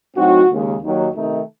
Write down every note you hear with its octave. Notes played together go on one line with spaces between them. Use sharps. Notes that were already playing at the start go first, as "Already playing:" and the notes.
A2 F#3 C4 D#4 F#4
D#2 C#3 G#3
D#2 D#3 F#3
C3 D#3 A3 D#4